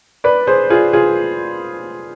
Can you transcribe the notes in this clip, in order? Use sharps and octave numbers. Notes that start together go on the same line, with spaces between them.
B4 D5
G#4 C5
F4 G#4
F4 G#4